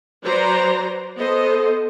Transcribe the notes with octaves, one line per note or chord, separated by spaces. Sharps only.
F#3 B4 C5 D5 A#5
B3 A4 C5 D#5